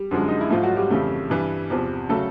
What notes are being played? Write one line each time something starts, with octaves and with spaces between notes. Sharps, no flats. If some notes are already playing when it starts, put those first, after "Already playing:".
Already playing: G3 G4
F#2 D3 F3 G#3
D#4
E4
G#2 F3 A3 F4
F#3 F#4
G3 G4
F2 C#3 E3 A3
G2 E3 G3
E2 C3 F3
C#3 F#3 A3 A4